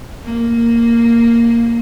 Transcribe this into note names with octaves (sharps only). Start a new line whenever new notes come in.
A#3